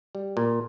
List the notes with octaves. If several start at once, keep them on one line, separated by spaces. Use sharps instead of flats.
G3
A#2